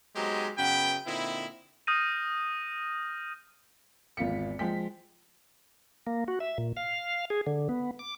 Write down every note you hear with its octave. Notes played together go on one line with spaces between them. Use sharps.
F#3 G#3 B3 C4 D#4 G4
F#2 C#3 B3 B4 G5
A#2 D3 C4 D#4 E4
D#6 F6 G6 A#6 D#7
G#1 E2 F4 B6 C#7
F3 G#3 G5 B6
A#3
F#4
E5
A#2
F5
G#4
D3
B3
D6